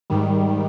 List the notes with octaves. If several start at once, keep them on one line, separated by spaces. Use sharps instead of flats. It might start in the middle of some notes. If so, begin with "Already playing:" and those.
G#2 D#3 G3